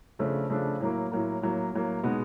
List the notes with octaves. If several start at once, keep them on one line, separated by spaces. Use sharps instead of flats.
C#3 F3 A3 D4
C#3 F3 A3 D4
A2 F#3 A#3
A2 F#3 A#3
A2 F#3 A#3
A2 F#3 A#3
B2 G#3 B3 D#4 F#4